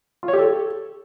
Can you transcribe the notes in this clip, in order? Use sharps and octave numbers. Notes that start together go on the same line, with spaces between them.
F4
C#5
G4
A4